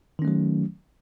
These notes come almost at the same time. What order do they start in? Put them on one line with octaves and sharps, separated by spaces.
D#3 C#4 A3 F#3